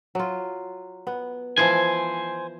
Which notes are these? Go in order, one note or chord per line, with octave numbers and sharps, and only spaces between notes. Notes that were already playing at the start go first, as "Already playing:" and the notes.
F#3 F4
B3
E3 F3 C5 G#5